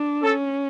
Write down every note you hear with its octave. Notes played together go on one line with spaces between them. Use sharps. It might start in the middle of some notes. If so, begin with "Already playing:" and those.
Already playing: D4
C#4 A4